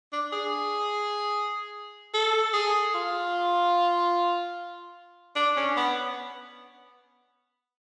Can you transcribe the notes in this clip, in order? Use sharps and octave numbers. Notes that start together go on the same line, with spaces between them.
D4
G#4
A4
G#4
F4
D4
C#4
B3